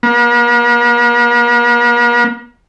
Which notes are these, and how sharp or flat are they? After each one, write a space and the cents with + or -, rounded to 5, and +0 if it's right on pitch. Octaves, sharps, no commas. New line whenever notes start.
A#3 +45